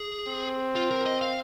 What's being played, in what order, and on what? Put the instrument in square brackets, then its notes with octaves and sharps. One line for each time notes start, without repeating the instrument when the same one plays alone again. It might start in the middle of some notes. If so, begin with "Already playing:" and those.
Already playing: [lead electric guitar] G#4
[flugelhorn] C4
[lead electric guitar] F4
A#4
D#5
F5